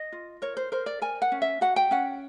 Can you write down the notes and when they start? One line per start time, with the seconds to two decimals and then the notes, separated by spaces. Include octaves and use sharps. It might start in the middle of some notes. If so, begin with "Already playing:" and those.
Already playing: D#5
0.12 F4
0.42 A#4 C#5
0.57 C5
0.72 A#4 C5
0.86 D5
1.02 A#4 G#5
1.22 F#5
1.32 C#4
1.42 E5
1.61 F#4 F#5
1.76 G5
1.91 C#4 F#5